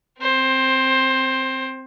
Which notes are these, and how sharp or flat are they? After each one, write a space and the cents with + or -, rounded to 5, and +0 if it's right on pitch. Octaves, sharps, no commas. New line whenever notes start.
C4 +0 C5 +15